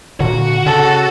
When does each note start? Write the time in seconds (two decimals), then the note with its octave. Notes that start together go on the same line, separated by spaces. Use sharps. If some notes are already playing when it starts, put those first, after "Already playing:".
0.20 A#2 D3 F#4
0.66 C#3 A4